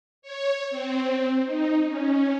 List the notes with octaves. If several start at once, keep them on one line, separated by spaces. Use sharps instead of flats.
C#5
C4
D#4
C#4